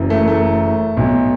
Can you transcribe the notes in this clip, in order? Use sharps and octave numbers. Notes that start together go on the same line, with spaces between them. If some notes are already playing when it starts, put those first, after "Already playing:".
Already playing: F#1 F#2 E3
A3
A3
B1 B2